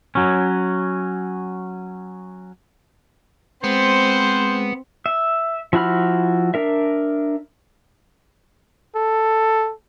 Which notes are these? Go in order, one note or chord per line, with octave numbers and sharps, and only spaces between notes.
F#3 C#4
G#3 B3 C4 C5
E5
F3 E4 F#4 B5 F6
D4 A#4 E5
A4